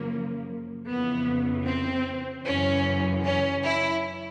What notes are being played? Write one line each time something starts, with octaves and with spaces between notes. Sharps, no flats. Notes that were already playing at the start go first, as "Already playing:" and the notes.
Already playing: F#2 C#3 F3 A#3
F2 C#3 E3 B3
C4
F#2 C#3 E3 C#4
C#4
E4